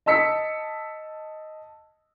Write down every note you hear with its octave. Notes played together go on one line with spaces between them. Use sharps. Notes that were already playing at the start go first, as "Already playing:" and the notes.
D#5 A5 E6 B6 C#7